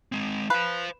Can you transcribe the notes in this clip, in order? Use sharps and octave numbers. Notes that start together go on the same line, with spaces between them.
G#3 C4
B4 C5 F5